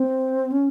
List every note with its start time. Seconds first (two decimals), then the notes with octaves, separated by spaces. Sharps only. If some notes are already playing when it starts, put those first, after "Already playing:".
Already playing: C4
0.52 C#4